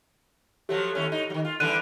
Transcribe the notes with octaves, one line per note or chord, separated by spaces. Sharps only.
F3 F#3 A3 G4
D#2 A3 C#4
A2 D#4
D#3 F#3
F4
D3 E3 G3 F#6 D#7